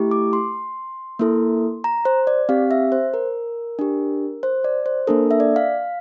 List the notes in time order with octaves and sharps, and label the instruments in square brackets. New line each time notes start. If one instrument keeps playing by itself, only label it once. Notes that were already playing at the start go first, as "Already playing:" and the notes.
Already playing: [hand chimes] A3 E4 G4
D6
C6
A#3 E4 A4
A#5
C5
D5
C4 G4 F5
E5
C5
A#4
D4 G4
C5
D5
C5
A#3 D4 A4 A#4
E5
D5
F5